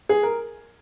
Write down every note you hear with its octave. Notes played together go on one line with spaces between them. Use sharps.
G#4
A#4